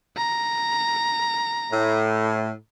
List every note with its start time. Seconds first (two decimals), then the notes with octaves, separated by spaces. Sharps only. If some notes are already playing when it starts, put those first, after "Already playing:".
0.17 A#5
1.72 A2